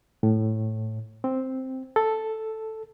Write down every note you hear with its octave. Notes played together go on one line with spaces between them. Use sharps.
A2
C4
A4